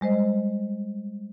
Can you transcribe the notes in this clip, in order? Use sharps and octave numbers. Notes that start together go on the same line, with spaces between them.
G3 G#3 C5 D#5